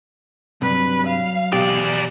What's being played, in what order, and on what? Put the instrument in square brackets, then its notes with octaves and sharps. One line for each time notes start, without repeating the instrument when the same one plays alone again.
[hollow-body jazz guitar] G2 C3 [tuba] F#3 [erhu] B4
[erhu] F5
[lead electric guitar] E2 D5 [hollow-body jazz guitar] B2 G4